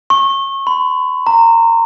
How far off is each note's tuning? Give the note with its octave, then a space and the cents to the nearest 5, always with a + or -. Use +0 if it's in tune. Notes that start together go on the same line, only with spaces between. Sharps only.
C#6 -30
B5 +45
A#5 -20